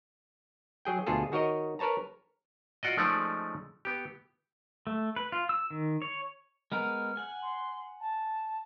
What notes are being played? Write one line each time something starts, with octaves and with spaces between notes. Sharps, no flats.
F#3 G#4 G5
D2 B2 F4 G#4 A4
D#3 F#4 A#4 C#5 D#5
A#4 B4 C#5 A5 A#5
F4 F#4 D5 D#5
F3 G#3 A3 C#4 D#4 D5
B3 G4
A3
B4
F4
E6
D#3
C#5
G#3 B3 A#4 F6
F#5 G#5
C6
A5